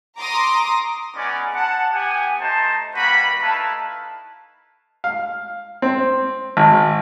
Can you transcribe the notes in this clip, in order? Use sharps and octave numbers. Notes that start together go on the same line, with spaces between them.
A#5 C6 D6 D#6 A#6
G#3 B3 C#4 D#4 D5 G#5
F#5 A5
B3 G4 F#5 G#5
A3 D#4 C5 A5
G3 A#3 F#4 B4 B5
A3 D#4 E4 B4 F5 A5
F5
C4
G#1